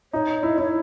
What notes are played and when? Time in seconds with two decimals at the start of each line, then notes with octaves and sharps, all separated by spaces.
0.13 D#4 C#5
0.43 E4 D#5
0.58 E4 C#5